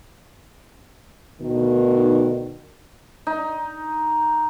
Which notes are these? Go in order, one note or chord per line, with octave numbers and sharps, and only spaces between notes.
D2 B2 D#3
D#4